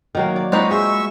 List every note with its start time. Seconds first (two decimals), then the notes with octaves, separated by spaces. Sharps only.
0.15 D#3 F#3 A#3
0.36 D5
0.52 G#3 C4 D#4 F4 F#4 B4 C#5
0.71 G#4 E5 C#6 E6